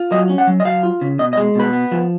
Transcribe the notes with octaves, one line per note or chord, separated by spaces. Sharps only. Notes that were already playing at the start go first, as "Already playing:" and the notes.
Already playing: F4
F#3 D#5
C#4
F#5
F#3
D#5
F#3 F5
F4
C#3
B2 D#5
D#5
G#3
B2 B4
B3
F3